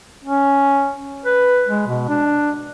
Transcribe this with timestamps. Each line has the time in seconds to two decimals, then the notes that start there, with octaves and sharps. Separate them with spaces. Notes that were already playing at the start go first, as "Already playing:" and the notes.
0.25 C#4
1.25 B4
1.68 G#3
1.87 B2
2.09 D4